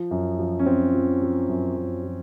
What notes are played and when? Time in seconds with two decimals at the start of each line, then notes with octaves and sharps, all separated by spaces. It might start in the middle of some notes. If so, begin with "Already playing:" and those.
Already playing: F3
0.11 F#2
0.39 F3
0.59 C#4
0.66 F3 C4
0.94 F3
1.22 F3
1.49 F#2
1.77 F#2
2.04 F3